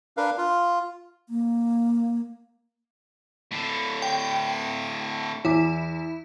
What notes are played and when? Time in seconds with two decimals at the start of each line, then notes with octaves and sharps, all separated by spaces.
0.17 D4 A#4 B4 F5
0.38 F4
1.29 A#3
3.52 A2 D3
4.02 G5
5.45 E2 E4 D6